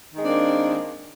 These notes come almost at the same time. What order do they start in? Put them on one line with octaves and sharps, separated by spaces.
D#3 G#3 C4 D4 A#3